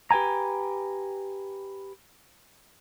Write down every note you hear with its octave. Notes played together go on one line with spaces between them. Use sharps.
G4 B4 G5 G#5 A#5